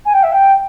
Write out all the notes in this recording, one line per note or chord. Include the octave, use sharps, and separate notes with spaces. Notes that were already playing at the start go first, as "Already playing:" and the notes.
G#5
G5
E5
G5